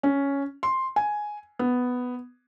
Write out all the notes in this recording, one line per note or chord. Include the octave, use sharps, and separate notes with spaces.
C#4
C6
G#5
B3